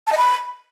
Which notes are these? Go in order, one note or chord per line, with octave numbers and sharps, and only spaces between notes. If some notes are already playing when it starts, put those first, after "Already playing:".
A5
D#5
B5